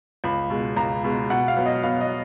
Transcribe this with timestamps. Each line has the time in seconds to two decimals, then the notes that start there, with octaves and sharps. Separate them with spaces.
0.24 C#2 B5
0.50 B2 G#3
0.76 C#2 A#5
1.04 B2 G#3
1.30 B2 F#5
1.48 F5
1.57 F#3 B3
1.66 D#5
1.83 B2 F5
2.01 D#5